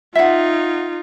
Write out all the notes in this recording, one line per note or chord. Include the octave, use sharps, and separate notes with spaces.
D#4 F4 E5 F#5